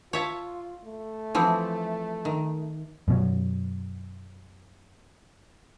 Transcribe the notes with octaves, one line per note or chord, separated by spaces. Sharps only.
F4 C#5 E5 A5
A3
E3 F3 C4
D#3
F#2 B2 F#3